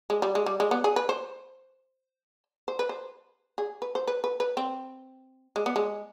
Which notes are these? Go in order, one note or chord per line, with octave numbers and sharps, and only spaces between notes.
G#3
G3
G#3
G3
G#3
B3
G#4
B4
C5
C5
B4
C5
G#4
B4
C5
B4
B4
B4
C4
G#3
B3
G#3